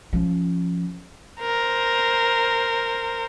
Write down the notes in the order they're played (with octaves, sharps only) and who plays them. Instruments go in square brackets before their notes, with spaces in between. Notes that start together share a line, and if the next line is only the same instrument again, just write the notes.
[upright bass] F3 C#4
[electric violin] A#4 C5